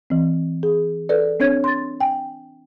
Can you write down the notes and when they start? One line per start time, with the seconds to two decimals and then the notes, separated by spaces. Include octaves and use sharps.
0.10 E3 C4
0.63 G#4
1.09 A4 B4 D5
1.40 C4 D4 C#5 G#6
1.64 C6 A6
2.00 G5 G#5